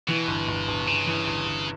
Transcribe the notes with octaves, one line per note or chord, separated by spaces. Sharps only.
B2 E3
G1
G1
G1
G1 C#3
E3
G1
G1